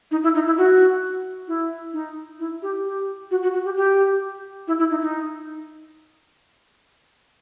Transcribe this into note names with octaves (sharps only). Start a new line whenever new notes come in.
D#4
E4
D#4
E4
F#4
E4
D#4
E4
G4
G4
F#4
F#4
F#4
G4
G4
E4
E4
D#4
D#4